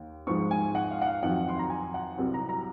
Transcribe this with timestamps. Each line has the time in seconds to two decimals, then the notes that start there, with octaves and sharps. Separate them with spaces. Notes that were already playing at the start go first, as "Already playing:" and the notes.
Already playing: D#2
0.27 G#2 F3 G#3 C#6
0.51 G#5
0.75 F#5
0.91 F5
1.02 F#5
1.06 F5
1.22 F2 D#3 F#3 F#5
1.49 C6
1.59 A#5
1.70 G#5
1.94 F#5
2.17 C2 C3 F#3
2.34 A#5
2.49 A#5